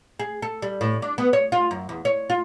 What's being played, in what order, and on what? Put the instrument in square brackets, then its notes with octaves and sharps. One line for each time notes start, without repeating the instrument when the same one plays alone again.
[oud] G#4
A4
G3
A2
D4
B3
C#5
F4
F#2
E2
C#5
F4